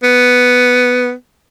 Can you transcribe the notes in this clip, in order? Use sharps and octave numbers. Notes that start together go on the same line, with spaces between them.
B3